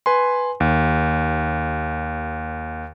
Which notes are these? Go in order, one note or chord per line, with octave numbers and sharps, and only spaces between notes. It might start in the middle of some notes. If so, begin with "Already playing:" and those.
B4 G#5 C6
D#2